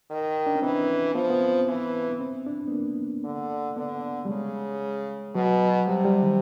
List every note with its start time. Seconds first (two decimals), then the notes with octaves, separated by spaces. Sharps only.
0.11 D#3
0.46 D4
0.55 C#4
0.62 E3 C4
1.15 F3 B3
1.30 B3
1.41 C4
1.68 E3
2.10 B3
2.20 C4
2.47 D4
2.68 B3
2.72 A#3
3.25 D3
3.77 D3 B3
4.25 G3
4.29 C#3 G#3
5.35 B2 F#3
5.88 C3 G3
6.05 G3
6.22 D#3